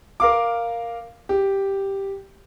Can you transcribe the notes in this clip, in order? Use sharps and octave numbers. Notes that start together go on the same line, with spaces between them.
A#4 F5 D6
G4